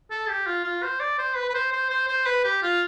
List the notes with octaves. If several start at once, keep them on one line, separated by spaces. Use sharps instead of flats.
A4
G4
F4
F4
C5
D5
C5
B4
B4
C5
C5
C5
C5
B4
G4
F4